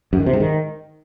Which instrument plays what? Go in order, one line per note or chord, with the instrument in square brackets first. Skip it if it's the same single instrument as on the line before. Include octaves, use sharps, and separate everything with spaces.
[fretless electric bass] F#2
D#3
C3
G#2
D#3